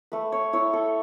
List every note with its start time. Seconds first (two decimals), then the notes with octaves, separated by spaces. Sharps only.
0.12 A3 B4
0.32 C#5
0.53 E4 C#5
0.73 A4